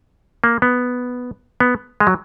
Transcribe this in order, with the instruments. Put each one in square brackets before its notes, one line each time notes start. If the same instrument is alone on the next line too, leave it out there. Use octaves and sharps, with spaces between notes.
[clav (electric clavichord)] A#3
B3
B3
G#3
F#3